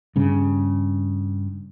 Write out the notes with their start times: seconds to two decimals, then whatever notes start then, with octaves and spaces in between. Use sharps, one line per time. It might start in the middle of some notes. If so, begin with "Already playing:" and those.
0.16 G2 C#3